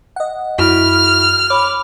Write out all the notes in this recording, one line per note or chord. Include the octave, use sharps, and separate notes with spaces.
D#5 F#5
F#2 E4 F#4 F6
C#5 B5 D6